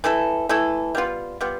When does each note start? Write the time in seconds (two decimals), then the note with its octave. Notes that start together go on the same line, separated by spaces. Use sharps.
0.04 E3 A3 E4 A4
0.49 E3 A3 E4 A4
0.95 G3 B3 F4
1.41 G3 B3 F4